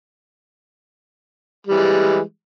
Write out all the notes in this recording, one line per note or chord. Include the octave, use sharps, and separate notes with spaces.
E3 G3 G#3